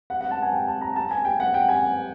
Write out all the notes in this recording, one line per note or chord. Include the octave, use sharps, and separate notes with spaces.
F#5
F#5
A5
G#5
G5
A5
A#5
A5
G#5
G5
F#5
G5
G#5